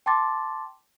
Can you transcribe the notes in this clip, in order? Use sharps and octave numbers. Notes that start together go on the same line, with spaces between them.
G5 A5 C6 D6 A6